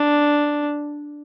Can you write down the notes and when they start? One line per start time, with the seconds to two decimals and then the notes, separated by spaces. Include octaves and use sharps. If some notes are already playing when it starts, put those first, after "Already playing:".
Already playing: D4